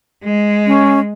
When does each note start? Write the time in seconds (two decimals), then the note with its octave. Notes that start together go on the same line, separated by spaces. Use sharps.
0.24 G#3
0.67 C#4